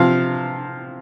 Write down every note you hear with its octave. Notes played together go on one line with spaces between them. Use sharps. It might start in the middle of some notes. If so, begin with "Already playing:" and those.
Already playing: C3 F3 F5